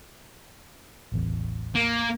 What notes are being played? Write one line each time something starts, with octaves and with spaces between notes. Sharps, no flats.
D1 A1 E2
A#3